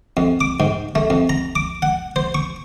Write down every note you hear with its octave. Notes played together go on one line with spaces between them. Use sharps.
F2
D6
G#2
A3
F2
A#5
D6
F#5
C5
C#6